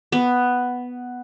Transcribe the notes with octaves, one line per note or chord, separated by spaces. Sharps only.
B3